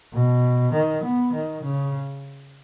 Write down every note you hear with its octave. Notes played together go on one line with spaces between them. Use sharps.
B2
D#3
B3
D#3
C#3